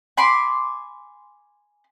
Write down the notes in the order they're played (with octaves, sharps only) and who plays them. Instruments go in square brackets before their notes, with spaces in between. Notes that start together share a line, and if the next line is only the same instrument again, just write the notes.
[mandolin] G#5 B5 C6 D6